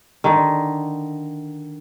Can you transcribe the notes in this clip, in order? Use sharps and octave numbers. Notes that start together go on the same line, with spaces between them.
D3 D#3